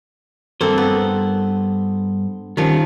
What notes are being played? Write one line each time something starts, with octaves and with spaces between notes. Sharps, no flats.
G2 A#3 C4 A4 C5
B3
D#3 F3 G3 C#4